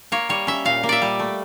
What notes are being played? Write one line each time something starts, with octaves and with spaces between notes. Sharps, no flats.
A#3 C#5
G3 C#5
C#4 E5
A#2 F5
A#3
D5 E5
G3
A3